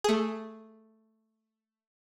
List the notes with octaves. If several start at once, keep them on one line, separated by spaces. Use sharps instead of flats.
A3 G#4